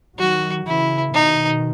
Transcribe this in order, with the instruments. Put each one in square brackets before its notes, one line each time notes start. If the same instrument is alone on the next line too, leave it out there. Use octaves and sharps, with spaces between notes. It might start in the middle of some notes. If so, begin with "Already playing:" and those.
[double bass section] D#3 F#3 [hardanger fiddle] F#4
[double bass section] C#3 E3 [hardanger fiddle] E4
[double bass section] B2 D#3 [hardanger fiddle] D#4